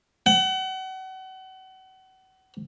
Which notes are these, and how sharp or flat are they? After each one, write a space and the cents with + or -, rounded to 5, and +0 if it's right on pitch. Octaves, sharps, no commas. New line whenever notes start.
F#5 +35